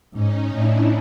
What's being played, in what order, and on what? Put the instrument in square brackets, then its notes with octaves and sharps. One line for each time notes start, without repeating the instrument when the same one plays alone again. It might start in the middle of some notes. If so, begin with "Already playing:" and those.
[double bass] G#2 [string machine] C#4 D#4
[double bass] A2 [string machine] D4 E4